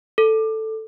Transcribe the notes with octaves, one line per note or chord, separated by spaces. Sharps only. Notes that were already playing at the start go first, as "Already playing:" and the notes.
A4